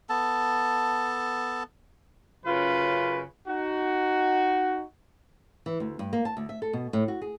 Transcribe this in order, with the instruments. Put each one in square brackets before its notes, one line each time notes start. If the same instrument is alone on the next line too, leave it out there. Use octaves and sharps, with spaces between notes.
[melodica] B3 A4 A5
[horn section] F#2 C#3 F4 B4
D#4 F#4
[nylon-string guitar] E3
D2
G2
A#3
A5
D2
E5
A4
B2
A2
F#4
G#4